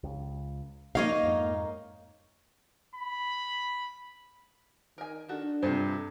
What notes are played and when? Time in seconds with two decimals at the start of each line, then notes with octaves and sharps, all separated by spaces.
0.03 C#2
0.95 F3 A#3 D#4 C#5 D#5 F5
1.23 F2 G#2
2.95 B5
4.98 D#3 A#4 G#5
5.29 D#3 D4 F#4 A4
5.63 G2 C3 F4 A4 C5